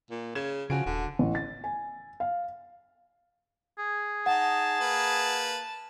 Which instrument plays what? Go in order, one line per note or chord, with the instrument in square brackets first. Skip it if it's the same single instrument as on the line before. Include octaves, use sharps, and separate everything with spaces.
[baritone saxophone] A#2
[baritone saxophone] C#3 [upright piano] G#6 E7
[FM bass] C#3 [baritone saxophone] F3 [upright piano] F#4 G#5 D7
[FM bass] D#1 [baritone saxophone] D3
[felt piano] A1
A6
G#5
F5
[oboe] G#4
[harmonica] D#4 [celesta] F#5 [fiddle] A5
[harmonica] A#3 B4